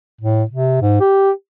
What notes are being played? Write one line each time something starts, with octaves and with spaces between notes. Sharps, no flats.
A2
C3
G#2
G4